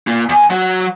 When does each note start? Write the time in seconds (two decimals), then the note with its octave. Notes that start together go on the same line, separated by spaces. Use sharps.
0.07 A#3 F4
0.29 E2 G#5
0.50 F#3 F#4